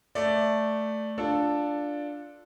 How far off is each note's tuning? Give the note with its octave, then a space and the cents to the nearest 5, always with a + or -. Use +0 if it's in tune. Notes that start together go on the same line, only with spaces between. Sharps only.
A3 +0 D5 +0
D4 +0 F4 +0 A4 +0